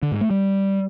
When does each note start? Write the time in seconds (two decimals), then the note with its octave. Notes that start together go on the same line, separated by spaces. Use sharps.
0.03 D3
0.12 G#2
0.21 A3
0.30 G3